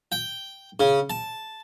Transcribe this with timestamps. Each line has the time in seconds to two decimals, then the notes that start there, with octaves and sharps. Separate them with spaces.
0.12 G5
0.80 C#3
1.10 A5